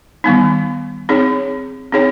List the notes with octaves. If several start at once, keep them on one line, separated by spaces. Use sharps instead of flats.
D#3 G3 B3 D#4
C4 D#4 G#4 C#5
C4 D#4 G#4 C#5